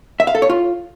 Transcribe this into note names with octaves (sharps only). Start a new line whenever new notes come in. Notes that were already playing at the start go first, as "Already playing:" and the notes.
E5
F5
A4
C#5
F4